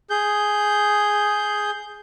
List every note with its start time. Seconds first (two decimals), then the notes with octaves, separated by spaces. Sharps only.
0.10 G#4 G6